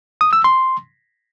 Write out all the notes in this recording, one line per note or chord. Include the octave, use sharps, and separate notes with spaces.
D#6
E6
C6